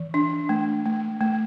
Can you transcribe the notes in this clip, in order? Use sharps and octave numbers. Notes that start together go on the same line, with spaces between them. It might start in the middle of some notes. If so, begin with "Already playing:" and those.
Already playing: E3
D4
A3
A3
A3